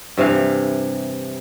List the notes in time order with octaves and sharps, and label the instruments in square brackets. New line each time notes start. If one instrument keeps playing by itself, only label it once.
[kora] G2 C3 E3 F5